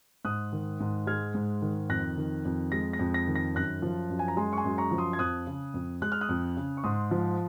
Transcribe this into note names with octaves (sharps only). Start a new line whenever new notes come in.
G#2 D#6 F#6
D#3
G#2
G#3 F6 G#6
G#2
D#3
F2 F#6 A#6
D#3
F2
G#3 A#6
A#6
F2
A#6
D#3
A#6
F#2 F#6 A#6
F3
F#2
G#5
A#5
G#3 G#5 C6
C#6
G#5 C6
F#2
A#5 C#6
F3
C6 D#6
G#6
F2 D#6 F#6
C#3
F2
G#3 F#6
F6
D#6 F#6
F2
C#3
C#6
G#2 C6 D#6
F3